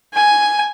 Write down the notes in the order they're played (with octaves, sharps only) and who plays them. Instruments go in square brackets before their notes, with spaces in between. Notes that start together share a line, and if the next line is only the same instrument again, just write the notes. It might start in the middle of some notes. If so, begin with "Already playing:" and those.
[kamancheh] G#5